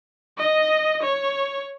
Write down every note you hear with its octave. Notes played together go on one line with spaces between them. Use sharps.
D#5
C#5